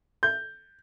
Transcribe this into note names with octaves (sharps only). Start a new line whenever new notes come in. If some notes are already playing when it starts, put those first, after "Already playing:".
G6